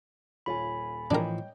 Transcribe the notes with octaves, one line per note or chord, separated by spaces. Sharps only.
D#1 F4 C#5 G#5 B5
A2 E3 F3 D4 A#4 C#5 D#5 G5